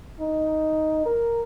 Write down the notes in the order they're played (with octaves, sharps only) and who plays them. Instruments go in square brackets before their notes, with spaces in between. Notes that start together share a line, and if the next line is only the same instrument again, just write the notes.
[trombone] D#4
A#4